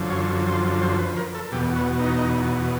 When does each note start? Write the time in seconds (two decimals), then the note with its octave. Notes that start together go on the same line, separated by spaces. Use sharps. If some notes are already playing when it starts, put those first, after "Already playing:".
Already playing: F#2 D3 F3
0.10 C#5
0.46 C5
0.81 C5
0.98 B4
1.17 A#4
1.35 A4
1.52 E2 B2 G4
1.76 F#4
2.00 D#4